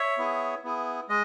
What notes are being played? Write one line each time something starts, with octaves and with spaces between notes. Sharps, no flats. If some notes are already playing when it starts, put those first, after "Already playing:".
Already playing: C#5 E5
B3 E4 G#4
B3 E4 G#4
G#3 D#5